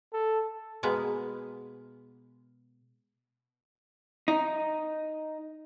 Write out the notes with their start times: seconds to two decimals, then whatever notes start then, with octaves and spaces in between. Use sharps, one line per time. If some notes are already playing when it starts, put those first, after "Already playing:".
0.13 A4
0.83 B2 G#3 A#3 B3
4.28 D#4